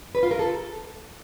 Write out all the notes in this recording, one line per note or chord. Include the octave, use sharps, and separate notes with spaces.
B4
F4
A#4
A4